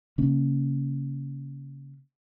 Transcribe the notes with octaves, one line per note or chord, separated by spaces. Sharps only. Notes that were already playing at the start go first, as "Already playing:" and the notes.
C#3 A#3 C#4